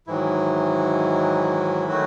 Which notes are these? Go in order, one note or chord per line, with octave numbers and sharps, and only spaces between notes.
G#2 D#3 E3 F#3 E4
D#3 F#3 A3 F#4